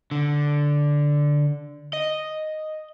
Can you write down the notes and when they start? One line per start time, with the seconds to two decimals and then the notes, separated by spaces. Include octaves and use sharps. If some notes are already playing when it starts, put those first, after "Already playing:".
0.11 D3
1.93 D#5